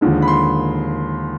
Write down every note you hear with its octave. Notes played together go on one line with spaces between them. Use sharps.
D#2 D3 F3 G#3
B5
C6